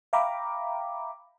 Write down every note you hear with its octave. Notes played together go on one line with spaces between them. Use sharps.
E5 F5 G5 A#5 B5 D6